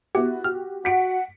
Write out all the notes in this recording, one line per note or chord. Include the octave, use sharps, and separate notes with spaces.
B3 E4 F#4 G4
F#4 G4 F6
F#4 F#5 B6 C#7 D7